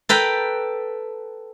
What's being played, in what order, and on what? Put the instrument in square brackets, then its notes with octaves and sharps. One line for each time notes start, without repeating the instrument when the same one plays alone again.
[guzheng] A4 B4 G5 A#5 B5